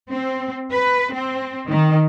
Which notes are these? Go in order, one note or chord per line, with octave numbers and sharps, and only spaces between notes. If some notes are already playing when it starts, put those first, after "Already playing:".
C4
B4
C4
D#3